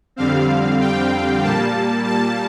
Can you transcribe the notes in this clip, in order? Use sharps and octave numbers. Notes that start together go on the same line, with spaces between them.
F2 D3 G3 C4 F5
G5
A#2 G3 A#3 A5
A5